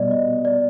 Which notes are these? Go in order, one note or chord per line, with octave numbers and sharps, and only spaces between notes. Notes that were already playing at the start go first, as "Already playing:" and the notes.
Already playing: B2 G3 B3 D5 D#5
D#5
D5